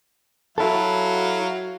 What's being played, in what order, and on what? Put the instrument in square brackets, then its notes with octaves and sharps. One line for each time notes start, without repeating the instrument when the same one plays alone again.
[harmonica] F#3 F5 [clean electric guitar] E4 F#4 A4